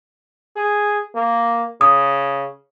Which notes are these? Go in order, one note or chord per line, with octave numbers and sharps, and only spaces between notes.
G#4
A#3
C#3 D#6